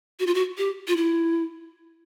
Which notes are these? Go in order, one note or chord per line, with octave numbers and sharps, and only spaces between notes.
F#4
F4
F#4
G4
F4
E4